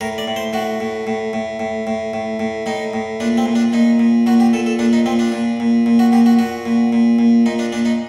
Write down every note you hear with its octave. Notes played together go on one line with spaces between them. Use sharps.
A2 A#4
D5
A2
C5
A2 F#4
A2
A2
A2
A2
A2
A2
A2
A2 D#4
A2
A#2 D4
C4
A#2
D4
A#2 D#4
A#2
A#2 F#4
G4
A#2 A4
A4
A#2 D4
D#4
A#2 C4
D4
A#2
A#2
A#2
F#4
A#2 G4
F#4
A#2 F#4
A#2
A#2
A#2
A#2 D#4
D4
A#2 D4
D#4